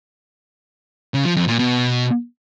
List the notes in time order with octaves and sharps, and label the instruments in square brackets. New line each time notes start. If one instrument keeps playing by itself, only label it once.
[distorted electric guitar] C#3
F3
F2
A#2
B2